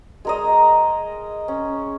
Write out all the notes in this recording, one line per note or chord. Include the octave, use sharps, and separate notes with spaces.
G#3 A#4 D#5
C#4